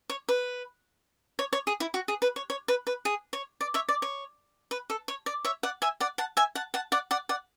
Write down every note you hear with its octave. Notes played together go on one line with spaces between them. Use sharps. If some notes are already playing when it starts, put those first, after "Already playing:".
C#5
B4
C#5
C#5
G#4
E4
F#4
G#4
B4
C#5
C#5
B4
B4
G#4
C#5
D5
C#5 E5
D5
C#5
B4
A4
C#5
D5
C#5 E5
D5 F#5
E5 G#5
D5 F#5
F#5 A5
E5 G#5
F#5 A5
F#5 A5
D5 F#5
D5 F#5
D5 F#5